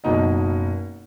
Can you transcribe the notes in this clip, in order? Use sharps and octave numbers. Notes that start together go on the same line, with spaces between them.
F#1 B2 D#4 D#5